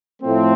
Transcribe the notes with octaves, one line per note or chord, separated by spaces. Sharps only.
A2 F3 A3 C4